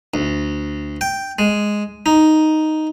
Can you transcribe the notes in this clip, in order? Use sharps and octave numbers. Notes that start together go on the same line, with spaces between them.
D2
G5
G#3
D#4